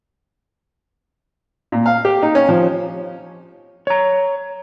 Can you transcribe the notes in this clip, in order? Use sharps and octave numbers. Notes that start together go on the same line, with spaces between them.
A#2
F5
G4
D#4
C#4
F3
C#5 A#5